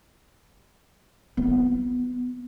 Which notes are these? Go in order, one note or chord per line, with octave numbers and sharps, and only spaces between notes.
B3 F4